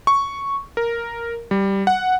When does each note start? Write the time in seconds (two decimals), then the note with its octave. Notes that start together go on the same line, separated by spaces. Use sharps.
0.07 C#6
0.77 A#4
1.51 G3
1.87 F#5